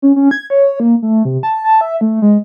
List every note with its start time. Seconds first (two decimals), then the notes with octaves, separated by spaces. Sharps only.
0.02 C#4
0.16 C#4
0.31 G#6
0.50 C#5
0.80 A#3
1.02 A3
1.25 C3
1.43 A5
1.64 A5
1.81 E5
2.01 A3
2.22 G#3